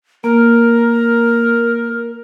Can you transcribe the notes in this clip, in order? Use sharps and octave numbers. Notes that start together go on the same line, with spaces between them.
A#3 A#4